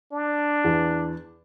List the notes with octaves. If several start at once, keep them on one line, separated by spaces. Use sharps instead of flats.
D4
E2